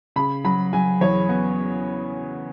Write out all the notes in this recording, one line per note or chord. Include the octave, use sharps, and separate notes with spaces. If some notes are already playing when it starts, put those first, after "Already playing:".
C#3 B5
F#3 B5
F#3 G#5
E2 C#5
B3